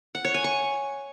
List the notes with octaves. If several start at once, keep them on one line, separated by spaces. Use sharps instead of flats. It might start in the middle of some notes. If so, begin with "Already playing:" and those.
F#5
C#5
G#5
C#6